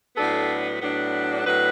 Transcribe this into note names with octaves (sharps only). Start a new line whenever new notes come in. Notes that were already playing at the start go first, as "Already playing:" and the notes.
A2 F#3 B3 D4 A4
A2 F#3 B3 D4
A2 F#3 B3 D4 B4